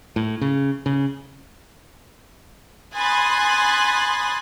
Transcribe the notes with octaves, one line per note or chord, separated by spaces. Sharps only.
A2
C#3
C#3
G#5 B5 C6 D#6 F#6 A6